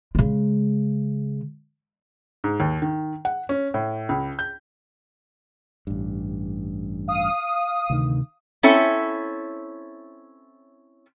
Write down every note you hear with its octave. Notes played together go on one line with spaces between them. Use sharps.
C#3 G#3
G#2
D#2
D#3
F#5
C#4
A2
C#2
G6
A1 G2
F5 D#6
D2 C3 D#3
C4 C#4 E4 A4 C#5 E5